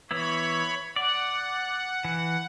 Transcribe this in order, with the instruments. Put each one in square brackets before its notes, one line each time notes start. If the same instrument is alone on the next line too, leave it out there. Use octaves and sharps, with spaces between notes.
[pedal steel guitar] E3 B3 E4 [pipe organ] C#5 B5
[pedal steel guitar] D5 [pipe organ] F#5
[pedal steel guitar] E3